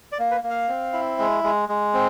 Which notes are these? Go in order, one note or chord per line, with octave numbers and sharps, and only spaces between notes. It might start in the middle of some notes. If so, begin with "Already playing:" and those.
D5
A#3
B4
A#3
F5
C4
E4
G#3
G#3
G#3
C4